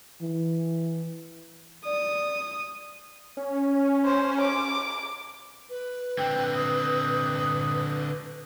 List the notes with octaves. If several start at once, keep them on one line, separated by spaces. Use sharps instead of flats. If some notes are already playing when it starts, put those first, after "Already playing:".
E3
D5 D#6
C#4
C5
D6
B4
D3 C4 G5
D#6